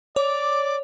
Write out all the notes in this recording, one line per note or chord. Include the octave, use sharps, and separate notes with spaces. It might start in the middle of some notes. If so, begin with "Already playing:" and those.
C#5 D5 D6